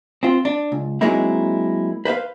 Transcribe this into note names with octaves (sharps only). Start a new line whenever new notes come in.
C4 F4
D4
C#2
F#3 G#3 A#3 C4 D#4 E4
B4 C5 E5 F5